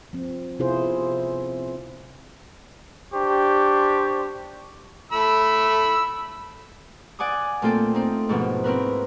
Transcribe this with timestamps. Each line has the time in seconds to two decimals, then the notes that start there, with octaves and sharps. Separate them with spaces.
0.13 F3 C4
0.59 C3 B3 E4 F4 G#4 C5
3.14 D4 G4 C5 C#6
5.12 A3 B5 E6
7.19 D5 F#5 G#5 D6 D#6
7.62 A#2 A3 C4 F4 A4 G5
7.94 C4 D#4
8.29 G#2 B2 F3
8.64 C4 E4 A#4 B4